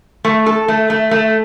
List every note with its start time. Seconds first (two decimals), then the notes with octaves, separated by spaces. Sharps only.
0.25 A3
0.46 A4
0.68 A3
0.90 A3
1.11 A3